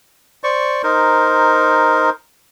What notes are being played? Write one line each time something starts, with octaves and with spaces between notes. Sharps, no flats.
C5 D5 C#6
D#4 A#4 C5